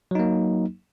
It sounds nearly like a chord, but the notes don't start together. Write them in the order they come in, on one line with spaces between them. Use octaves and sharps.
F#3 D#4 A#3